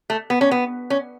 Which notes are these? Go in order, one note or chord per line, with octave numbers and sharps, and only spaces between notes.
A3
B3
C#4
B3
C#4